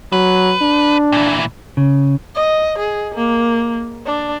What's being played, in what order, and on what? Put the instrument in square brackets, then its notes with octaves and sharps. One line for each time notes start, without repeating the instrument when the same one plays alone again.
[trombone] F#3 [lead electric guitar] B4
[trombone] D4
[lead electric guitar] A#2 E3
[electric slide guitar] C#3
[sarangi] D#5
G#4
A#3
D4